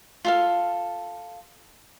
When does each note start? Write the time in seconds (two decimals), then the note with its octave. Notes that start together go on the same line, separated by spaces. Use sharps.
0.25 F4 A4 F5